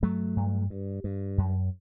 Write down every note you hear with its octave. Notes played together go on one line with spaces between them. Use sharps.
G2 F#3 A3
G2
G2
G2
F#2